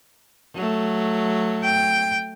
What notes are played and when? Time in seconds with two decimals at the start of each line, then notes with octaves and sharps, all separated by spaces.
0.54 F#3 A3
1.64 G5